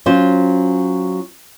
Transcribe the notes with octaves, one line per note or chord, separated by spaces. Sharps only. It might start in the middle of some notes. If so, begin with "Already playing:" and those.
F#3 C#4 F4 C5